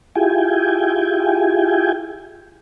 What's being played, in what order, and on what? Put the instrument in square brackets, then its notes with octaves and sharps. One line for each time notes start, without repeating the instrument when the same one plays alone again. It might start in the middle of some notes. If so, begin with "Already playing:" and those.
[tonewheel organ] E4 F4 G4 G#4 G5 G#5